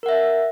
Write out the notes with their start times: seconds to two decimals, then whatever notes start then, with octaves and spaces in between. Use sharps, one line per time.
0.03 A#4
0.06 F#5
0.09 E5